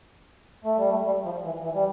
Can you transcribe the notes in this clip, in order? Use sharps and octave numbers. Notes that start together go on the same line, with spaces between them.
A3
G3
A3
G3
F3
E3
E3
G3